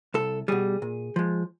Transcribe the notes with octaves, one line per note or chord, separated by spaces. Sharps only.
C2 A4
B2 G3 G#4
A#2
F3 G#3